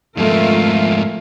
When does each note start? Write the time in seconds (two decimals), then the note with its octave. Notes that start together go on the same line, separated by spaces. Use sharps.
0.17 F2 G#2 A3 F4 A#4